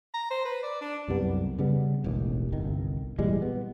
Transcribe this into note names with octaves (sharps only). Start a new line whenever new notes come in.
A#5
C5
B4
D5
D4
C2 F#2 G3 B3
C#3 G3 B3
E1 A1 D#2
G1 C2 D#3
A#2 E3 G3 G#3
B3